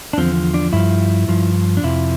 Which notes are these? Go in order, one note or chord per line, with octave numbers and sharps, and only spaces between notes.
D4
E2 D3 F3 C4
D4
G2 F3 E4
G2 F3
D4
F2 C3 F3 E4